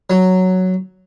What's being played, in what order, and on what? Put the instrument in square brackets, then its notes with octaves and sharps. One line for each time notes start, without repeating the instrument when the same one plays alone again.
[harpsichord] F#3